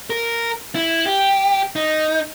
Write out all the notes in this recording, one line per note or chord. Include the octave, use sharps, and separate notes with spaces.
A#4
E4
G4
D#4